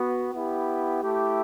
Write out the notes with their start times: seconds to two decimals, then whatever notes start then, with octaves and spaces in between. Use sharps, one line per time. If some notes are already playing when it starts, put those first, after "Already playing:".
Already playing: B3 F#4
0.32 B3 E4 G4
1.02 A3 E4 G4